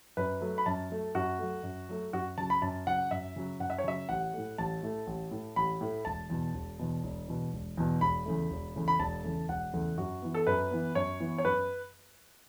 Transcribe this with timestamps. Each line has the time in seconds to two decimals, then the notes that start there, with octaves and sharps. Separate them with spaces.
0.17 F#2 B4
0.41 F#3 A3
0.58 B5
0.66 F#2 A5
0.90 F#3 A3
1.15 F#2 F#4
1.39 F#3 A3
1.63 F#2
1.89 F#3 A3
2.13 F#2 F#4
2.38 C#3 F#3 A5
2.50 B5
2.62 F#2 A5
2.87 C#3 F#3 F#5
3.11 F#2 E5
3.36 C#3 F#3
3.59 F#2 F#5
3.70 E5
3.78 C#5
3.84 C#3 F#3 E5
4.09 A1 F#5
4.34 A2 A3
4.58 A1 A5
4.82 A2 A3
5.07 A1
5.31 A2 A3
5.56 A1 B5
5.81 A2 A3
6.05 E1 A5
6.30 E2 B2
6.54 E1
6.79 E2 B2
7.03 E1
7.28 E2 B2
7.53 E1
7.77 E2 B2
8.01 E1 B5
8.26 E2 C#3 A3
8.50 E1
8.75 E2 C#3 A3
8.88 B5
8.99 E1 A5
9.24 E2 C#3 A3
9.48 E1 F#5
9.73 E2 C#3 A3
9.98 F#2 F#4
10.22 E3 B3
10.34 A4
10.47 F#2 B4
10.71 E3 B3
10.95 F#2 C#5
11.20 E3 B3
11.38 C#5
11.45 F#2 B4